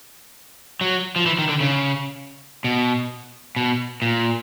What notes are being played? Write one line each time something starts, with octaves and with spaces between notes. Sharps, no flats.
F#3
F3
E3
D#3
D3
C#3
B2
B2
A#2